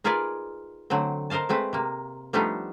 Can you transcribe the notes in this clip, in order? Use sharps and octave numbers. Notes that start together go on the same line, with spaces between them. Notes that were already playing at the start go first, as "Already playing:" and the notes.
D#4 F4 G#4 A#4 B4 D5
D3 F#3 A3 C4
A#4 C5 D#5 F5 A5
G#3 A3 C4 B4
C3 A#3
F3 G3 A3 B3 D4 D#4